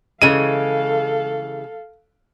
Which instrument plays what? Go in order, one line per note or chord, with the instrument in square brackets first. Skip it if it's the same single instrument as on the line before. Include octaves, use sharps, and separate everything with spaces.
[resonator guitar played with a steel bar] C#3 E3 G#3 [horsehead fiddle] A4 F5 [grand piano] D#7